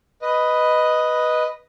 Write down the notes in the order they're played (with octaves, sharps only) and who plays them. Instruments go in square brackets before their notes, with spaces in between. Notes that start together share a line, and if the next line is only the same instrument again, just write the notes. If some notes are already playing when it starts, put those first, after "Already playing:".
[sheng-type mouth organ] B4 D#5